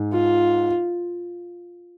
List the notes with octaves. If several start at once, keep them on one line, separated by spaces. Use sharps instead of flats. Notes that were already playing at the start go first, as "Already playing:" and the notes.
Already playing: G#2
F4